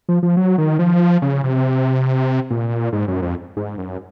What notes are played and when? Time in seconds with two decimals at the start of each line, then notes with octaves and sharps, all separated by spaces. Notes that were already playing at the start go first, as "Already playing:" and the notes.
0.09 F3
0.23 F3
0.37 F#3
0.58 D#3
0.79 F3
1.22 C#3
1.44 C3
2.51 A#2
2.93 G#2
3.08 F#2
3.22 F2
3.57 G#2
3.78 F#2